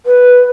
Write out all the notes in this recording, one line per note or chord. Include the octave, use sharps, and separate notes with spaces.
B4